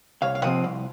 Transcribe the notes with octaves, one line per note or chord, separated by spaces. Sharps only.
C2 C#5 F5
F5
C3 F3 C4 D#5 F#5
C2